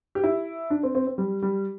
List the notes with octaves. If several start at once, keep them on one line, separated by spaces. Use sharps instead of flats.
G4
E4
D4
C4
C4
C4
G3
G3